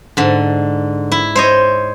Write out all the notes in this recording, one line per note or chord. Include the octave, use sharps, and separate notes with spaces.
G#2 D3
E4
C5 C#5 D#5